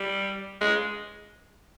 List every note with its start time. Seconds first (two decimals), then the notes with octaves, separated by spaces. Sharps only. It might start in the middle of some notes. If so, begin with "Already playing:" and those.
Already playing: G3
0.61 G#3